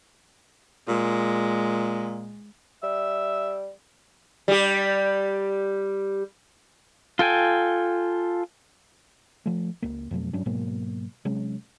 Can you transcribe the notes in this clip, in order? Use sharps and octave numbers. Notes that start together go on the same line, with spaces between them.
A#2 G#3
G3 E5
G3 G4
F4 A4 G5 G#5
F3 A3
C#2 A#3
F2 B2 F#3 A3
G2 F#3 C#4 D4
G#2 B2 F#3 A#3
C3 F#3 G#3 C#4